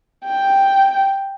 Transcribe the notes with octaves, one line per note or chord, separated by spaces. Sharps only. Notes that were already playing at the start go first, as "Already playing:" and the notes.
G5